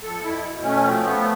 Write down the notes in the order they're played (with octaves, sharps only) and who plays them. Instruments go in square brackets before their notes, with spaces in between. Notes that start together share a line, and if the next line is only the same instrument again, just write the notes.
[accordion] F2 A4
F2 E4
B2
A3 C#4
F3 C4
A3 B3